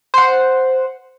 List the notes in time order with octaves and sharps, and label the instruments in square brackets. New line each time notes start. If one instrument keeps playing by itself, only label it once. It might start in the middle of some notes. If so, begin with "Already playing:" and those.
[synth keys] C5 F#5